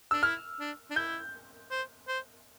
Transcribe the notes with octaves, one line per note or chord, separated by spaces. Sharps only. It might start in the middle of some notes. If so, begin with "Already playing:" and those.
D4 E6
E4 F6
D4
D4
E4 G6
C5
C5